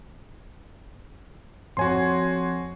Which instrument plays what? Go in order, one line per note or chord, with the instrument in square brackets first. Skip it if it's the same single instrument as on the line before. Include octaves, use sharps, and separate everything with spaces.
[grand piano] F2 C#5 [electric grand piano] F#4 G#5 C6